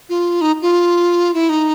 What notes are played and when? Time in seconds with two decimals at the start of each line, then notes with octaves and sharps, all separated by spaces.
0.09 F4
0.41 D#4
0.62 F4
1.34 E4
1.49 D#4